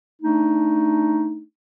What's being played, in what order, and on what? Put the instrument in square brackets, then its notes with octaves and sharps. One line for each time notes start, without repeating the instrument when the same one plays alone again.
[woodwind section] A3 D4 D#4